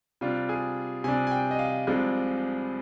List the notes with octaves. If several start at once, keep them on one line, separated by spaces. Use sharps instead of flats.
C3 G3 D4 F4
G#4
C3 G3 D4 G#5
G#5
G5
D#5
F5
C2 C3 F3 G#3 D4